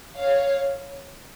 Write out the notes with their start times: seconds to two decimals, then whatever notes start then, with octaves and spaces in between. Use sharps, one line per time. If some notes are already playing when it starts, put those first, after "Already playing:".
0.18 C#5 F5